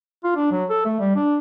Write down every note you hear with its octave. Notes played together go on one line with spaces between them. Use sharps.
F4
D4
F#3
A4
A3
G3
D4